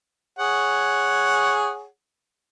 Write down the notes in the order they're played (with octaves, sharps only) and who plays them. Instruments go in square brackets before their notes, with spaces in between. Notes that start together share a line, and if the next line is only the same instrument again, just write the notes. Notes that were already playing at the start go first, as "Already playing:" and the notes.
[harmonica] G#4 C#5 F#5